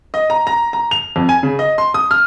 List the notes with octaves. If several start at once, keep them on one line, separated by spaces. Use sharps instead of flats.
D#5
A#5
A#5
A#5
F7
F2
G#5
C#3
D#5
C6
D#6
F6